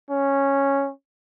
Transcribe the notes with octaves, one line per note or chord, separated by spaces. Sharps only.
C#4